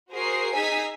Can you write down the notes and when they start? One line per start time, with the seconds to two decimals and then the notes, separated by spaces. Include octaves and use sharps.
0.12 F#4 G#4 A#4 C5 C7
0.54 D#4 G#4 G#5 E6 B6